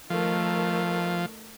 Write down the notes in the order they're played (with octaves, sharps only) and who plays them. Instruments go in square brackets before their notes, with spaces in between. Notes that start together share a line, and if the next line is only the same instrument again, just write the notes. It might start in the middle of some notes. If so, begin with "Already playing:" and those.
[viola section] D#3 A3 [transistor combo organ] F3